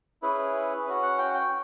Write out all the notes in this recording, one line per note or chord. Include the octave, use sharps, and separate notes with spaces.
C#4 E4 G#4 B4
C#4 F#4
F#5
G5
G5